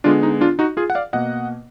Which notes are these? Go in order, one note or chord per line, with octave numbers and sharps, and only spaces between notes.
D3 G#3 B3 D4 F4
D#4
D4 F4
D#4 F#4
F4 G#4
F#5
D5 F5
B2 A#3 D#5 F#5